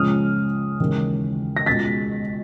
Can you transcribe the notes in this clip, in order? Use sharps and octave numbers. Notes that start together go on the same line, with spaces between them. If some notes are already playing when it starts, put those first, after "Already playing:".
Already playing: C#2 C#3 F3 G#3 D#6 F6
D#2 C#3 E3 G#3
A#6
C#2 B2 G#3 A6 B6